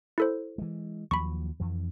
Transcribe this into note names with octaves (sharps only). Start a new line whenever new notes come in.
E4 A4 C5
E3 G#3
D#2 F3 F#3 B5 C#6
F2 E3